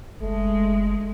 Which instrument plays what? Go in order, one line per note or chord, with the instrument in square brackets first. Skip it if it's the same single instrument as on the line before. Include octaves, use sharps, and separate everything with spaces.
[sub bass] F#1 [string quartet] G#3 [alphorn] A3